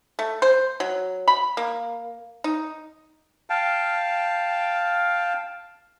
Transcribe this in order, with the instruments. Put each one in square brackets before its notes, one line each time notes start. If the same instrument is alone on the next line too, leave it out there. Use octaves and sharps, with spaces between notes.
[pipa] A3
C5
F#3
B5
A#3
D#4
[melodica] F5 G5 A5